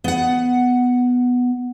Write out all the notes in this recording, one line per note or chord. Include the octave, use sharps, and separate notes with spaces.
B3 F#5